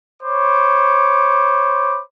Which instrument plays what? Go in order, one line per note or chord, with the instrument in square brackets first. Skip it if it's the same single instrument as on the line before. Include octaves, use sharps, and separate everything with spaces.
[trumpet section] C5 C#5 B5 D6